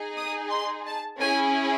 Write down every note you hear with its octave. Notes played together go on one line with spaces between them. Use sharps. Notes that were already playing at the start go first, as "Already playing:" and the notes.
Already playing: D#4 G#4
D#6
C6
A5
C#4 E4 G#4 G#5